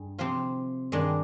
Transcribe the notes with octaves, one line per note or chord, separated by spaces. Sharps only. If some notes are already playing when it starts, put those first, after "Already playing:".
Already playing: G2 G#4
C3 F3 C4 F4 C5
G2 D#3 G#3 D4